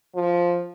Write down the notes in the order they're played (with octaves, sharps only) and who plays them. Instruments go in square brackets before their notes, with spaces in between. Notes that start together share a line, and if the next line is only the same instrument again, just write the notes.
[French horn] F3